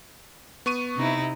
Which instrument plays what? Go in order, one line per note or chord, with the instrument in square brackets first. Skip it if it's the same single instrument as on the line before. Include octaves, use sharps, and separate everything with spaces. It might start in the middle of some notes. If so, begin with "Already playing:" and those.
[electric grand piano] B3 C#6 D#7
[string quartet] C3 D#4 E4